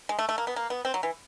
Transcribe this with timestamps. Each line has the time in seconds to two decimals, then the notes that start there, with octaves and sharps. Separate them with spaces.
0.09 G#3
0.19 A3
0.29 A3
0.38 A#3
0.47 B3
0.56 A#3
0.70 B3
0.85 C4
0.94 F#3
1.03 E3